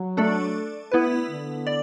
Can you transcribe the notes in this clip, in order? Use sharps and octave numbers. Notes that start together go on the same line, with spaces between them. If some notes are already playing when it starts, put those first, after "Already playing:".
Already playing: F#3
A3 D4 A4 D5
B3 E4 B4
D3
D5